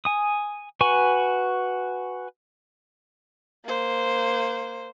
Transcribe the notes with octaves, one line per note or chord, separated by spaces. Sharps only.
G#5 D#6
F#4 B4 G#5 C#6
A#3 C5